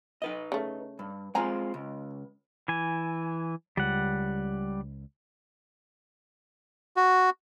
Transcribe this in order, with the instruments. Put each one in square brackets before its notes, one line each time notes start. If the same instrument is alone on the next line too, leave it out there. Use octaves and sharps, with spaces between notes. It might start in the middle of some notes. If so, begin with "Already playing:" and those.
[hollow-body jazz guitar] D#4 B4 D#5
[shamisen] C#3 A3
[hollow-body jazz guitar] G2
[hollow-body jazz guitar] G#3 C4 F4 [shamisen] G#5 A#5
[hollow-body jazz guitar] C#2
[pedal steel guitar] E3 G#5
[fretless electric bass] C#2 [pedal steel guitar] G3 F#5
[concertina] F#4